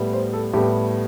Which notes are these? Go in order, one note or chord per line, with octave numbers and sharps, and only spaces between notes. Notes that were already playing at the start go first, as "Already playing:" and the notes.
Already playing: A2 G3 B3
C5
A4
A2 G3 B3 G4